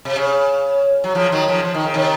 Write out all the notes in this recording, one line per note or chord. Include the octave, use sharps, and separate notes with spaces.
C3
C#3
F#3
C#3 F3
D#3 F#3
C#3 F3
F3
D#3
C#3
C3 D#3